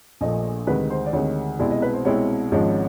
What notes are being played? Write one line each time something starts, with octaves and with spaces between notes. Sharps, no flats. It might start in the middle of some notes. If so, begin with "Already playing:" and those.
A#1 A#2 F3 A3 D#5
D2 C3 D#3 G#3 B4
C5
D5
D2 C3 D#3 G#3 C#5
C2 B2 G#3 C4 E4 D5
D#5
B4
C5
C2 B2 G#3 C4 E4 C#5
G#1 G#2 F3 G#3 C#4